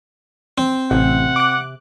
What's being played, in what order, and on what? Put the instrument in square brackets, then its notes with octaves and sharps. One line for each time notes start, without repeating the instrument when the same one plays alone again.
[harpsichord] C4
[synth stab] A1 [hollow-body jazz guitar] C3 [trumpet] F#5
[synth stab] D6 F#6